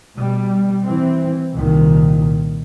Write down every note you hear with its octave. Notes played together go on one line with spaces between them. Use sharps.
B2 G3
E3 C4
C2 A#2 D#3